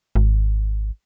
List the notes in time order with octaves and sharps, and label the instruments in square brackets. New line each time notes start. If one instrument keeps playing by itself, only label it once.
[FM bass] G#1